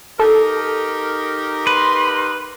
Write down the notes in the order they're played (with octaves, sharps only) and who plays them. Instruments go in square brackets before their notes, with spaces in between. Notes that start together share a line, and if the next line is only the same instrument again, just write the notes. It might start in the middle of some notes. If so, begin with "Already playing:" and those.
[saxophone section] D#4 G4 A#4 [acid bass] A4
[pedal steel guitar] B4 [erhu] C6